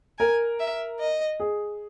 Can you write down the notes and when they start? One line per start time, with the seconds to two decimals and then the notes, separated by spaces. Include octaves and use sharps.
0.19 A#4 G#5
0.60 E5
1.00 D#5
1.40 G#4